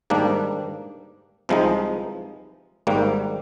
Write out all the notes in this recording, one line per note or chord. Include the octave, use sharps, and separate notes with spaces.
G#2 D#3 G3 A#3 D4
C2 C3 F3 G#3 D#4
G#1 G#2 G3 A#3